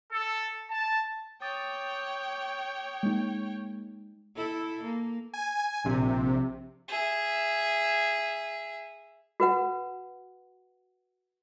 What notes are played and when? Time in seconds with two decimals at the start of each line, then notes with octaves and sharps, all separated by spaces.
0.12 A4
0.71 A5
1.42 C#5 G5 D6 D#6 A6
3.03 G#3 A#3 D#4
4.36 E4 A4
4.84 A#3
5.34 G#5
5.85 A#1 C3
6.88 G#4 E5
9.40 F#4 B4 F#5